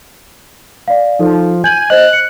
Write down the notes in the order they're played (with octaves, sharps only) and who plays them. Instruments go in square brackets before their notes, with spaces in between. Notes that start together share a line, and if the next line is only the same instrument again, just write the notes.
[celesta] D5 F5
[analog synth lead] F3 [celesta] D#4 A4
[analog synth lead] G#5 [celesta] G6 F#7
[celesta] C5 D#5 [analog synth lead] F#6
[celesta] C#7